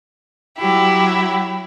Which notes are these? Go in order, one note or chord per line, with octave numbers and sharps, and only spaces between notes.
F#3 E4 G4